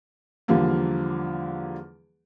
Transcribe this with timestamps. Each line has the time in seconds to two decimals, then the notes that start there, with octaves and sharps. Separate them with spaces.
0.48 E2 D3 F3 G3 A#3